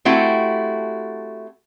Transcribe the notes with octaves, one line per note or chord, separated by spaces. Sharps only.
A3 C4 E4 F#4 G4